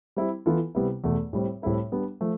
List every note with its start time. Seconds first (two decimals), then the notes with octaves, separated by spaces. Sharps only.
0.16 G3 C4 E4
0.46 E3 B3 F4 A4
0.75 C3 G3 B3 E4
1.04 E2 B2 A3
1.33 A2 G3 C4
1.62 A2 G3 C4 E4 A4
1.92 G3 B3 D4
2.21 F3 A3